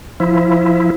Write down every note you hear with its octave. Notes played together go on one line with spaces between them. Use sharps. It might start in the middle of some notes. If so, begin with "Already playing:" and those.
F3 E4